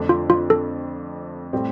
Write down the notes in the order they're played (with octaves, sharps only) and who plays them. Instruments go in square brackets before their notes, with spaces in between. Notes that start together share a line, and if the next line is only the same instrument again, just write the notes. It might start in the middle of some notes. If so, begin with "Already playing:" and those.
Already playing: [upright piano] F2 D3 A3 D4
[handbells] F4
F4
A4
[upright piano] A2 G3 C4 G4